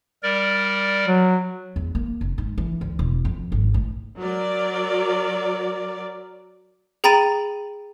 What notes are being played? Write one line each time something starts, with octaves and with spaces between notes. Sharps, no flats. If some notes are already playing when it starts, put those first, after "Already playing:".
G3 A#4 D5
F#3
E2
A#3
F1
G#2
E3
D2
E1
F2
G#1
A2
F#3 A#4 D5
G#4 G5 A#5 B5 A6 D#7